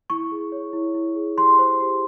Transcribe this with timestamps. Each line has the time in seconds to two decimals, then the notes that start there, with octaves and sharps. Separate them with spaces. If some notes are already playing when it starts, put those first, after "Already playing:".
0.10 E4 C#6
0.31 G#4
0.52 C#5
0.73 E4
0.94 E4
1.16 G#4
1.38 G4 C6
1.59 C5
1.80 G4